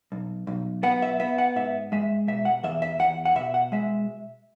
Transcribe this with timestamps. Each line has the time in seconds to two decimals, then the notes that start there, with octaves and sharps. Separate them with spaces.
0.12 B1
0.47 B1
0.83 B3 F#5
1.02 E5
1.20 B3 E5
1.38 F#5
1.56 G#2 E5
1.92 G#3 E5
2.28 B2 E5
2.45 F#5
2.64 E2 E5
2.82 E5
2.99 E2 F#5
3.25 F#5
3.35 B2 E5
3.54 F#5
3.72 G#3 E5